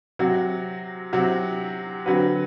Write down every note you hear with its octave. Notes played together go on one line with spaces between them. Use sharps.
C3 F#3 C4 F#4
C3 F#3 C4 F#4
D3 F#3 C4 F#4 B4